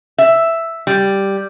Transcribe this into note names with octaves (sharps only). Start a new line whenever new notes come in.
E5
G3